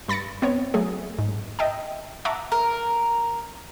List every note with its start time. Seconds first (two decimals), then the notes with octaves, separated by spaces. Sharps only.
0.08 G2 B5 A6 A#6 C#7
0.42 B3 C4 C#5
0.74 F#3 A3 G#4
1.19 G#2
1.59 D#5 E5 G5 A5
2.25 E5 F#5 A5 A#5 C#6 D6
2.52 A#4